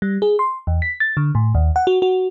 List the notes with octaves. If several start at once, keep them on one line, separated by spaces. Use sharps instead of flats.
G3
G#4
C6
E2
B6
A6
D3
A2
D#2
F#5
F#4
F#4